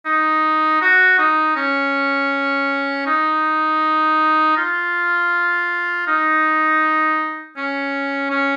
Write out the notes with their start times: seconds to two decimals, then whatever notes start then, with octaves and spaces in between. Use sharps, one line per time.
0.06 D#4
0.81 F#4
1.18 D#4
1.56 C#4
3.06 D#4
4.57 F4
6.07 D#4
7.57 C#4
8.31 C#4